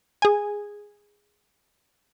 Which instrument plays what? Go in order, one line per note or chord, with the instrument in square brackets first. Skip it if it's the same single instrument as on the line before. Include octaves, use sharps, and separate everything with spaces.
[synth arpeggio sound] G#4 G#5